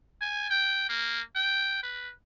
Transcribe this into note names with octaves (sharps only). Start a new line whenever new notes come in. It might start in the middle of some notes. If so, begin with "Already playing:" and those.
G#5
G5
A#3
G5
B4